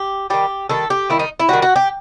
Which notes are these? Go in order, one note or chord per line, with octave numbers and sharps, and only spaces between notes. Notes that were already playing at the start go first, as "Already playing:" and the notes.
Already playing: G4
D#3 G3 G4
D#3 G3 A4
G4
D#3 G3 E4
D#4
E4
D#3 G3 F#4
F#4
G4